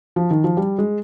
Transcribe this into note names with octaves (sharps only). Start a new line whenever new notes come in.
F3
D#3
F3
G3
G#3